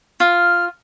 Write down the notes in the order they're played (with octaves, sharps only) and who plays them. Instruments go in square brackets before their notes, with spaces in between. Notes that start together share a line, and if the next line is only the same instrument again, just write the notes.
[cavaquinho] F4 [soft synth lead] F6